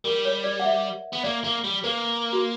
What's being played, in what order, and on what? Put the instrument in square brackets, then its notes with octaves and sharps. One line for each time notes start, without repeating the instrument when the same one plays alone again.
[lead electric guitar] G3 [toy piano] A#4
[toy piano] C#5
D5
F#5
E5
[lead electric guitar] B3
[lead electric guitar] A#3 [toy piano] D5
[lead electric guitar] A#3
G3
[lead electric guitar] A#3 [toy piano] B4
[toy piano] F#4